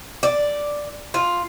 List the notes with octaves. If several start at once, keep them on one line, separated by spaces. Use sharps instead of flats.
D5
F4